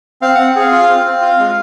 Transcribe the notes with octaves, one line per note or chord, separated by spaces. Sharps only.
C4 F5
C4 F#5
G#4 F5
F4
C4
C4
F4
G#3